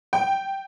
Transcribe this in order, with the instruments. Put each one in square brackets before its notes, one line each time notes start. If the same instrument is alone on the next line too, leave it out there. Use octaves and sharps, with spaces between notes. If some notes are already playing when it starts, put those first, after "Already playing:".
[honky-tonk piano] G5